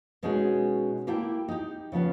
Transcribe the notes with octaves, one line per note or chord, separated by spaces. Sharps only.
B2 G#3 C#4 D#4 F#4 G#4
A#3 E4 G4 A4 G5
D#4 G4
C#3 F3 B3 C#4